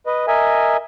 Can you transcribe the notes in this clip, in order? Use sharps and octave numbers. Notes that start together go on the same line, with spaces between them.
B4 D#5
A#4 D#5 E5 G#5